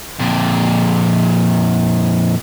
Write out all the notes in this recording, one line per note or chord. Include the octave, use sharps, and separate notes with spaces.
F2 A#2